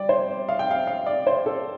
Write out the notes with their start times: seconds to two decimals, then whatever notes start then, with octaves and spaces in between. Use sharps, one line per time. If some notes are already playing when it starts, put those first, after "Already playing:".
Already playing: G3 D5 G5
0.09 C5
0.49 F5
0.59 G5
0.71 F5
0.87 F5
1.06 D5
1.27 C5
1.46 A4